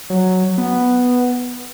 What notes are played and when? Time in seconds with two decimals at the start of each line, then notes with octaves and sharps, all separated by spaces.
0.10 F#3
0.58 B3